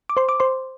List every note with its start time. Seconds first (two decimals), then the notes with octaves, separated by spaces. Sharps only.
0.09 D6
0.17 C5 C6
0.29 D6
0.40 C5 C6